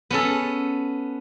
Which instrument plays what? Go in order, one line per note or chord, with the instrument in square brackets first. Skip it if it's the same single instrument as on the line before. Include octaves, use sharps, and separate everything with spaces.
[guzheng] B3 C#4 A4